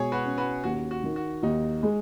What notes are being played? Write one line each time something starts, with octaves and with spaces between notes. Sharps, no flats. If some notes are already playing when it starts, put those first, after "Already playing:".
Already playing: B2 G#3 G#4 C#5
F#4 B4
C#4
F#4 B4
D#2 F#4
F#4
D#3
F#4
D#2 D#4
G#3